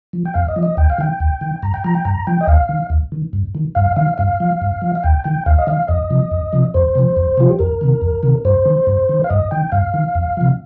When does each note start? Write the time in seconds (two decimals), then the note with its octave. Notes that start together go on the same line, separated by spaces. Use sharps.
0.13 F3
0.25 G5
0.34 F2 F5
0.48 D#5
0.56 F3
0.63 D#5
0.77 D#2 G5
0.90 F5
0.98 D#3 G5
1.20 D#2
1.41 D#3
1.63 G2 A#5
1.74 G5
1.84 F3 A#5
1.95 G5
2.05 G2 A#5
2.27 F3 G5
2.41 D#5
2.47 D#2 F5
2.69 D#3
2.90 D#2
3.12 D#3
3.33 G2
3.55 D#3
3.75 G2 F5
3.96 D#3 F5
4.18 G2 F5
4.40 F3
4.62 G2
4.82 F3
4.95 F5
5.04 D#2 G5
5.24 D#3 G5
5.46 D#2 F5
5.59 D#5
5.67 D#3 F5
5.88 F2 D#5
6.10 C3 F3
6.31 F2
6.53 C3 F3
6.74 F2 C5
6.95 C3 F3
7.16 F2
7.37 C3 F3 F4
7.49 G4
7.59 F2 A#4
7.81 C3 D#3
8.02 F2
8.23 C3 D#3
8.45 G2 C5
8.66 D#3
8.87 G2
9.09 D#3
9.24 F5
9.30 G2 D#5
9.51 D#3 G5
9.72 G2 F5
9.94 D#3
10.15 F2
10.37 C3 F3